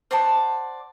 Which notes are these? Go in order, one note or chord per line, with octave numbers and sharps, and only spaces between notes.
C5 D5 F#5 A5